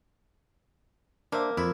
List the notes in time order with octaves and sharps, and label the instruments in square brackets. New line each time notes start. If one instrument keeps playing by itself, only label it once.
[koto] A#3 [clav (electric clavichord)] D4 C5 E5
[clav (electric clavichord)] F2 [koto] E4